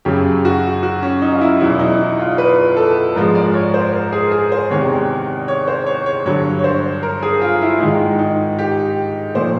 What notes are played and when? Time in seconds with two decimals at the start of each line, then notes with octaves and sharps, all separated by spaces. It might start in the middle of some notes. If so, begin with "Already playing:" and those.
0.05 F#2 C#3 F#3 G4
0.45 F#4
0.83 F#4
1.02 C#4
1.22 D#4
1.32 F4
1.41 E4
1.60 E2 B2 F#3 E4
1.79 D#4
1.99 E4
2.19 F4
2.38 B4
2.77 A4
3.15 G#2 F3 G#3 A#4
3.35 D5
3.54 C#5
3.74 C5
3.93 A#4
4.13 G#4
4.32 G#4
4.52 C5
4.70 E2 C3 D#3 G#3 C#5
5.48 C#5
5.68 C5
5.87 C#5
6.06 C#5
6.25 G2 D3 F#3 C#5
6.59 C#5
6.64 C5
7.03 A#4
7.23 G#4
7.41 F4
7.61 E4
7.80 G#2 D#3 G#3 D#4
8.19 D#4
8.59 G4
9.35 A#2 F3 A3 C5